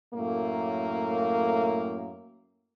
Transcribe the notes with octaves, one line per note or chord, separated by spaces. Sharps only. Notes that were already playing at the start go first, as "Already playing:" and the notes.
F#2 A2 A3 A#3